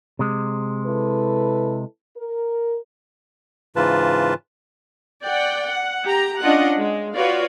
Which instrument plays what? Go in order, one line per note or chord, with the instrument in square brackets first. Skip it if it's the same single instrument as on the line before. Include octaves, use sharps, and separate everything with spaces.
[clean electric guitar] C3 G#3
[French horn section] E4 A4 B4
A#4
[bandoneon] G#2 C#3 E3 F4 B4 A5
[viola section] D5 F#5 G5
F#5
G4 A#5
C#4 D4 F4 D#5 F#5
G#3
F4 F#4 B4 C#5 D5 F5